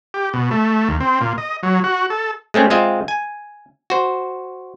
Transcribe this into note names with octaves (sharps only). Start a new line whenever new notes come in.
G4
B2
A3
D#2
C4
A#2
D#5
F#3
F#4
A4
G#3 A3 C4 C#4
G#3 C4 F4 D#5 E5
G#5
F#4 C5